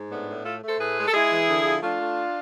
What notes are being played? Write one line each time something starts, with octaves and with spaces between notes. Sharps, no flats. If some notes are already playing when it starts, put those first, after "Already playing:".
Already playing: G#2
A2 B3 D4
A2
A3 F4 A4
A3 A4 C5
A2 G#4 B4
G#3
A4
G#3 E4 G#4
E3
D3
F3
A3 D4 F4
A3